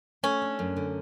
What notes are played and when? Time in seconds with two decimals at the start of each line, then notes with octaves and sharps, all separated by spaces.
0.23 A3 C#4
0.42 D4
0.59 F#2
0.76 D3